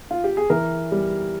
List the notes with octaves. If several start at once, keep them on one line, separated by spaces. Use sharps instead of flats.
F4
G4
G#4
E3 A#4
G3